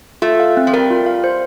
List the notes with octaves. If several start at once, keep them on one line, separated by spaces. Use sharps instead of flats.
A3 F4
F5
C4
F3
G3 A#4
F4
F5
C5